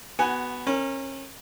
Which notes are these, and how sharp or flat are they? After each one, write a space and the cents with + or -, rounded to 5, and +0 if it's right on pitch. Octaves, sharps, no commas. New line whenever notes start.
B3 +0 F#4 +25 G#5 +0
C#4 -35 A#4 -15